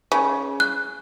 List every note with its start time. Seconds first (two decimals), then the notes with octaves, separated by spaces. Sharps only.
0.12 C#3
0.60 F#6